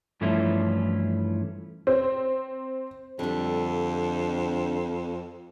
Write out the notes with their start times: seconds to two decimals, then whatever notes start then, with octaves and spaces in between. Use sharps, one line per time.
0.21 G2 E3 F3 A3 C#4 E4
1.87 C4
3.19 F2 D3 G3